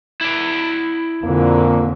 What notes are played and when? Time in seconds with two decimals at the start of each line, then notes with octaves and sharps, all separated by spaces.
0.21 E4 D5
1.24 F2 A#2 D3 A#3